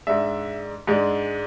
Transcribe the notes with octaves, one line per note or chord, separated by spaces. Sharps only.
G#2 G#3 D4 E5
G#2 G#3 D4